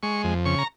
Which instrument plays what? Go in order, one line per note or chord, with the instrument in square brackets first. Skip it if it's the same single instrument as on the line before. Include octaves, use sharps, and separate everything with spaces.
[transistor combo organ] G#3 C#6
F2
C#3 C#6
A#5